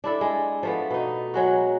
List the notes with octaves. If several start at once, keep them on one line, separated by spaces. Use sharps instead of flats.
D4 E4 A4
G#3
F3 A3 B3
B2 D#4
F#3 G#3 F#4